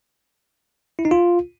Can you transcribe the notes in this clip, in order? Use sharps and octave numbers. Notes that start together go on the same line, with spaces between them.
E4
D#4
F4